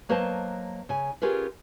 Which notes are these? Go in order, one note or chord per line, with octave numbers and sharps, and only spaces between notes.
F#3 A#3 B4 C5 D#5 A5
C#3 G#5
C#4 F4 G4 G#4 A#4 B4